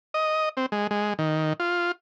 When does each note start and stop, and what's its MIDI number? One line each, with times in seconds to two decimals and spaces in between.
0.14 0.49 75
0.57 0.66 60
0.72 0.87 56
0.91 1.13 56
1.19 1.53 51
1.60 1.92 65